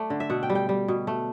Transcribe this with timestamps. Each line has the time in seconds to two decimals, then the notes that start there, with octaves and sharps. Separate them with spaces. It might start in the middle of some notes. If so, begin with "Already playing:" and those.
Already playing: A3 D5
0.10 D3
0.20 E5
0.30 B2 F#5
0.43 G5
0.50 G3
0.55 G5
0.69 G3
0.88 B2
1.07 A3